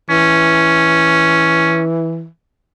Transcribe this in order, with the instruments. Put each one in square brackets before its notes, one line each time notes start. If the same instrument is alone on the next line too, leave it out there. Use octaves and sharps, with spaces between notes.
[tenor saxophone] E3 [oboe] C#4